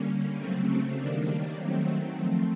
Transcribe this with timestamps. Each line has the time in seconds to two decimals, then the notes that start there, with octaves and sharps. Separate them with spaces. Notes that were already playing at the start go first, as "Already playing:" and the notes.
Already playing: D3 G3 A#3 C#4
0.36 C#3 F#3 A3 C4
0.97 D#3 G3 A#3 D4
1.57 D#3 F#3 A3 C4
2.17 F3 A3 C4